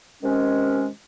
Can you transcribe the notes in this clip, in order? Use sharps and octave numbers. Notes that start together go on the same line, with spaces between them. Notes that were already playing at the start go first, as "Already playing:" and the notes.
C3 D#3 G#3 C#4